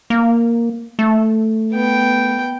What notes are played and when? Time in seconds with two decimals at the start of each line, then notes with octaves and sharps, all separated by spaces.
0.10 A#3
0.99 A3
1.72 B3 G5